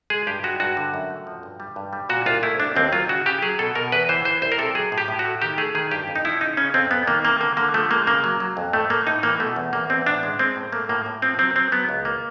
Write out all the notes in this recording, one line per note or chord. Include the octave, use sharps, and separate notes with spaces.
G#3 G#4
G2 G4
G#3 F#4
G2 F#4
D3
F#2
A3
F3
G2
G3
G2
G3
A#2 F#4
C2 F4
A3 E4
C2 D4
D#2 C4
F#3 F4
C#3 F#4
C#3 G4
F#3 G#4
B2 A4
B2 A#4
E2 B4
E3 C5
E3 C5
C2 C5
A#4
C3 A4
F#3 G#4
A2
G4
A2
F#4
A3
D#3 G4
A3 G#4
D#3 G#4
G2 G4
F2
D#4
F3 E4
C#3 D#4
C#3 C#4
F2 C4
F2 B3
D#3 A#3
C3 A#3
D3 A#3
D3 A#3
F3 A3
G#3 A#3
C#3 A#3
F#3
F#3
F2
A2 A3
A3 A#3
A2 D#4
E3 A#3
B2 A3
E2
E2 A#3
E2 C4
A2 D4
G#3
G#3 C4
A2
A3 A#3
A2 A#3
A2
F3 C4
F#3 C4
F#3 C4
F#3 B3
C#2
A#3